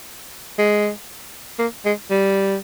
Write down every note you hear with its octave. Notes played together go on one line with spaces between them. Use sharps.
G#3
A#3
G#3
G3